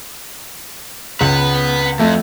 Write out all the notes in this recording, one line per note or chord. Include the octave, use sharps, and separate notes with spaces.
C#2 B4 F#5
F2 A3